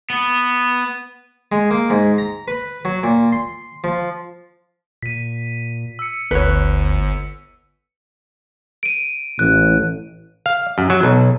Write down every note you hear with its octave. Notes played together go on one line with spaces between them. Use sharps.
B3
G#3
A#3
G#2
A#5
B4
F#3
A#2
C6
F3
A#2 B6 D#7
E6 C#7
G1 D2 B4 C#5
D7 D#7
A1 A2 F#6
F5
F#2
F#3
B1